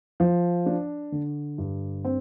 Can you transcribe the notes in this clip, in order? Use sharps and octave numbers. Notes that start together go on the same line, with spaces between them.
F3
D4
D3
G2
C4